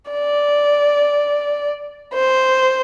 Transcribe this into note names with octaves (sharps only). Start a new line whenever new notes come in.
D5
C5